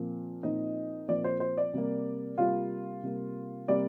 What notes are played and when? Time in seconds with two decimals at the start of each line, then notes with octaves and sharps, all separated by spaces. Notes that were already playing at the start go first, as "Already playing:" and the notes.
Already playing: A#2 F3 C4
0.43 A#2 F3 C4 D#4 D#5
1.08 A#2 F3 C4 D5
1.24 C5
1.40 C5
1.57 D5
1.74 C3 G3 A#3
2.38 C3 G3 A#3 F4 F5
3.03 C3 G3 A#3
3.68 C3 G3 A#3 D5